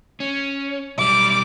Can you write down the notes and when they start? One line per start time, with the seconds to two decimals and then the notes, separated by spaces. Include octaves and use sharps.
0.20 C#4
0.98 B1 G3 D6